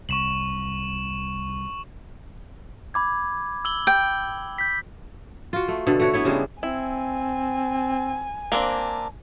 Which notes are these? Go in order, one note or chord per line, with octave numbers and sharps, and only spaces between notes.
C2 C#6 E7 F#7
B5 D6 G#6
E6 F#7 G7
G5
G6 B6
F4 F#4
A3
B2 D3 A4
A3 F#4 C#5
B3 E4 C#5
C#3 G3 G#3 D4
C4 E4 G#5
A#3 C4 D4